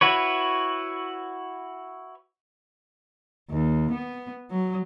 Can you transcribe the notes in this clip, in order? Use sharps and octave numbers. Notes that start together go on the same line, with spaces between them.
E4 F#4 B4 C#5
D#2
B3
F#3